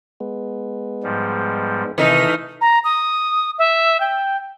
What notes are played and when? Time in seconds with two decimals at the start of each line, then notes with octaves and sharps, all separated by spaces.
0.20 G#3 B3
1.03 G#2 F3 G3
1.98 C3 D#3 E3 A3 D#4 D#6 F6
2.61 A#5
2.84 D#6
3.59 E5
4.00 G5